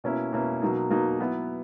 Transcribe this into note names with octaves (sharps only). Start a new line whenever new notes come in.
B2 A#3 C#4 E4
B2 A#3 C#4 E4
B2 F#3 A#3 D#4
B2 F#3 A#3 D#4
F#3 B3 E4